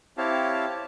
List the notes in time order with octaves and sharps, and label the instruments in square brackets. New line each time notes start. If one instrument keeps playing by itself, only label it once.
[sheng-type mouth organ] C4 E4 G4 C#5 F5 A5